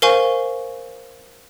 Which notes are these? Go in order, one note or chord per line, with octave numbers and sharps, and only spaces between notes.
A#4 C5 F5 G#5 C#6